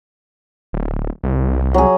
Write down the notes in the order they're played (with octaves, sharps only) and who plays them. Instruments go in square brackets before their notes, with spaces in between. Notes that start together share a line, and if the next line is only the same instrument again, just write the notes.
[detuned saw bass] D1
C2
[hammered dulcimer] F#3 G#4